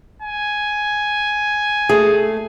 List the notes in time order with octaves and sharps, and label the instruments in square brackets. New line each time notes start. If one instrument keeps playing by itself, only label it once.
[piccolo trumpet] G#5
[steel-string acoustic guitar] A3 [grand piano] G#4